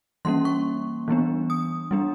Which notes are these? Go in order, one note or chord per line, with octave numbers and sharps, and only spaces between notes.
E3 G3 A#3 C#4 C6
C#6
E3 G3 B3 D4
D#6
G3 B3 D4